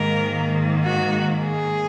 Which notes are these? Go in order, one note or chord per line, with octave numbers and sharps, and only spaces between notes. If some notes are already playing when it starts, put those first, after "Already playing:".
Already playing: G#2 D#3 A#3 A#4
F#4
G#4